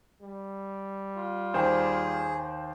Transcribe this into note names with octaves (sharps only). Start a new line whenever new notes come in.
G3
F4
D#2 G#4 C5 G5